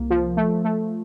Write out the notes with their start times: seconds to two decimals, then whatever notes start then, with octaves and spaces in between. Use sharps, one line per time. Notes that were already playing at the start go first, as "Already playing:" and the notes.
Already playing: C2 A#3
0.10 F3
0.37 A3
0.64 A3